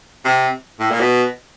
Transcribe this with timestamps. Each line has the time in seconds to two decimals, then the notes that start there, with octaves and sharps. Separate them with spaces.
0.25 C3
0.80 A2
0.91 A#2
1.00 B2